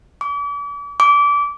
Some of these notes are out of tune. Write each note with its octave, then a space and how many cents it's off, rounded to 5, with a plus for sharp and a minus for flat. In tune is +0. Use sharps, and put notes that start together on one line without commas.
D6 -40
D6 -25